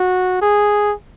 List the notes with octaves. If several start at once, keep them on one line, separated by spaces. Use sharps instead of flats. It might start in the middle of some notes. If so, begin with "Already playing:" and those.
Already playing: F#4
G#4